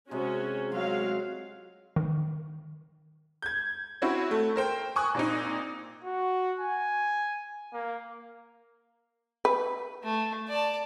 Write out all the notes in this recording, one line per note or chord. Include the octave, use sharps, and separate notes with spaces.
C3 G#3 C#4 F#4
F#3 G#3 F4 F5
D#3
G6 G#6
C4 C#4 E4 F#4
A3
A#4 C5 G5
G#5 C#6 D#6 F#6
A#2 C4 D#4
F#4
G#5
A#3
B4
A3
D5 A5